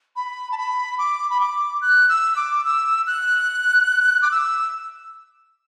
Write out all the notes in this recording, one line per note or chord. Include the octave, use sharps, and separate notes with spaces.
B5
A5
B5
D6
B5
D6
F#6
E6
D6
E6
F#6
D6
E6